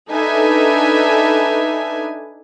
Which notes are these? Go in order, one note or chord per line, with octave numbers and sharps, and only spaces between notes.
D4 D#4 A4 B4 E5 G#5